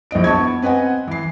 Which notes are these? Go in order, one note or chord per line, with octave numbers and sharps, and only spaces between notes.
A#1 E4 D#5 D7
B3 A5 C#6 G#6
C4 B4 D#5 F#5 G#5
E3 C7